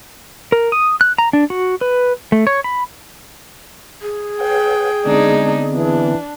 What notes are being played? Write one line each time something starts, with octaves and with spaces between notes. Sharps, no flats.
A#4
D#6
F#6
A#5
D4
F#4
B4
A3
C#5
B5
G#4
B4 C#5 F#5 G5
D3 G#3 B3 C4 D4 D#4
E3 D4